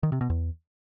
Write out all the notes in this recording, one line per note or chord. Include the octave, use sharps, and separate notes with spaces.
D#3
C3
B2
E2